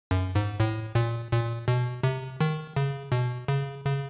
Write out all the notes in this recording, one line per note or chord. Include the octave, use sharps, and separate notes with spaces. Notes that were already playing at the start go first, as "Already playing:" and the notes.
F#2
G#2
A2
A#2
A#2
B2
C3
D#3
C#3
B2
C#3
C#3